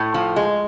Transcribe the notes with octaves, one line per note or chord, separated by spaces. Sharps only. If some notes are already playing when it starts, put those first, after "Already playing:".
Already playing: A2
F3
G#3